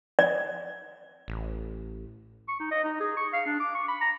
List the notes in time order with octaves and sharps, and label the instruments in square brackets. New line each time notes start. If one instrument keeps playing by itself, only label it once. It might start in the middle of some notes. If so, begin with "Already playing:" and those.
[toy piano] D5
[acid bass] A1
[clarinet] C#6
D#4
D#5
D#4
G#4
C#6
F5
D4
D6
C#6
B5
A#5